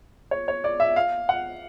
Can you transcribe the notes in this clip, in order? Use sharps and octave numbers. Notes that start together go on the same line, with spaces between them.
C#5
C#5
D5
E5
F5
F#5